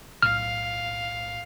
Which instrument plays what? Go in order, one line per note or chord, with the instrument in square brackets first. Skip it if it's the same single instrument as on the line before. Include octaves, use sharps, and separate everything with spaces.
[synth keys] B1 A2 [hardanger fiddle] F5 [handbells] F6